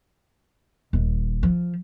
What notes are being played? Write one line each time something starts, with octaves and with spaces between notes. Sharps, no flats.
D#1
F3